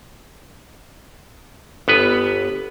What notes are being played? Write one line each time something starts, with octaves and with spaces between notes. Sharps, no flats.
G1 B3 B4